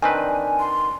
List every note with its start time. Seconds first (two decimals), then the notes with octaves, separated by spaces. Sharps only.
0.02 D#3 C4 D4 B4 G#5 D6
0.60 C6